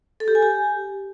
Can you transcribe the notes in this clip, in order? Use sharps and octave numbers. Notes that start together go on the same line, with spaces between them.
A4
G4
G#5
G4